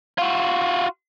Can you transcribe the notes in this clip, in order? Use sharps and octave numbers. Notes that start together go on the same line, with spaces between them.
F4 F#4